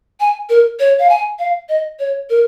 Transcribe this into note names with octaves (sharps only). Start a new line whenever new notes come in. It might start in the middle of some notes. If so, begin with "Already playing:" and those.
G#5
A#4
C#5
F5
G#5
F5
D#5
C#5
A#4